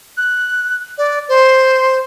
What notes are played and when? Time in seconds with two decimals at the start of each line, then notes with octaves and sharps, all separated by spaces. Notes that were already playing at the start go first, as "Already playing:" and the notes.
0.17 F#6
0.98 D5
1.29 C5